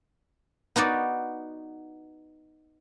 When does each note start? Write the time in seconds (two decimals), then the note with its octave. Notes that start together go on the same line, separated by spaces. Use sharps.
0.76 B3 D#4 F#4 D5